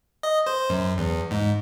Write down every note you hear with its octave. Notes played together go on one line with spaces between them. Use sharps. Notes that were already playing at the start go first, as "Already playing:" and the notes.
D#5
C5
F#2
E2
G#2